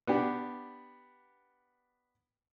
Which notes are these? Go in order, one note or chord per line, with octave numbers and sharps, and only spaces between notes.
B3 D4 G4